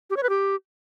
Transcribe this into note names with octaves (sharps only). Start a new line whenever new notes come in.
G4
C#5
B4
G4